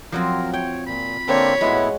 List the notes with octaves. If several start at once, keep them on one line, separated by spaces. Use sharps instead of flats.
F3 F#3 C4 A#4
C#5 G5
A#2 B5
D3 A#3 C4 C#5
A2 G#3 B3 E4 F#4